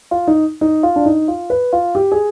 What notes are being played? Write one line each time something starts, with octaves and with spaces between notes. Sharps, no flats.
F4
D#4
D#4
F4
D4
D#4
F4
B4
F4
G4
G#4